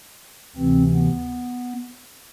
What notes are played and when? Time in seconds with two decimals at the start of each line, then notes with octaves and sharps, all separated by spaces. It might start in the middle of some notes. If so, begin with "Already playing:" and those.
0.55 D2 C3 E3 C4
0.94 B3